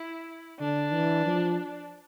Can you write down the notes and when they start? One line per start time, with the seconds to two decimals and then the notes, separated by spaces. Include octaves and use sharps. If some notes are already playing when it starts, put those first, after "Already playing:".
Already playing: E4
0.59 D3 D4
0.93 E3
1.26 F3